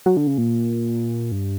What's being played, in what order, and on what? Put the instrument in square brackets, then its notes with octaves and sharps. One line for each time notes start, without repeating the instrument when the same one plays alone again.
[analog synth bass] F#3
D3
C#3
A#2
G2